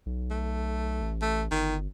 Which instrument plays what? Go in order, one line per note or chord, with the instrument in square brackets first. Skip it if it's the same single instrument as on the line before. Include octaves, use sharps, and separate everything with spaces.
[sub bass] B1
[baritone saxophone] A3
[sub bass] A1
[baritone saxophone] A3
[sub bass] G1 [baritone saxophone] D#3